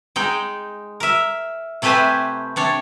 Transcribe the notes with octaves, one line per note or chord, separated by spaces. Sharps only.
G#3 D#4 G5
A#4 E5
C3 A3 G4 B4 C5 G#5
C3 D4 C#5